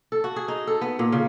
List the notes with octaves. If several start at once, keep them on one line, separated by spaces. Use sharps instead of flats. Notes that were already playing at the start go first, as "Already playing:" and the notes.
A4
F#4
G#4
D#4
A4
B3
A#2
C#3